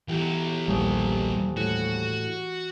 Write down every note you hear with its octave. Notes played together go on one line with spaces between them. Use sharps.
B1 E3 F#3 G4
D#1 A#1
A2 F#4